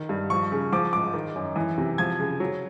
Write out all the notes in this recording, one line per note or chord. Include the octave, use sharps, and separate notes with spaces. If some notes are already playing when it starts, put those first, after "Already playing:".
Already playing: D#3
G2
F3 C#6
C#3
F3 D6
G#2 D6
D#3
F#2
E3
C3
F3 G#6
C#3
F#3